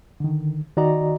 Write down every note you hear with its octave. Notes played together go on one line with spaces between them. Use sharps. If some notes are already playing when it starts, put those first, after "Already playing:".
D3 D#3
D#3 F#4 D5 D#5 A#5